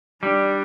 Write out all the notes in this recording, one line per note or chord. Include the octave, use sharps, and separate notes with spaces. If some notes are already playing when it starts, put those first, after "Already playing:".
G3 D4